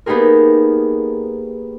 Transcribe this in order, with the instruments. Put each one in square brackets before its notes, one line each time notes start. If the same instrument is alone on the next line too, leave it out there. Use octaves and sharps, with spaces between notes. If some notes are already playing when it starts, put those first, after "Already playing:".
[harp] A#3 B3 D#4 G4 G#4 A#4